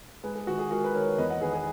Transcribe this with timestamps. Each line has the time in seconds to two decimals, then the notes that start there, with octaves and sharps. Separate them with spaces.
0.24 G#2 G#4 B4
0.35 G#4
0.47 D#3 F#4
0.59 G#4
0.71 G#2 F#4 A#4
0.84 B4
0.94 D#3 A#4 C#5
1.18 E2 B4 D#5
1.30 D#5 F#5
1.41 D#3 G#4 B4
1.53 G#4 B4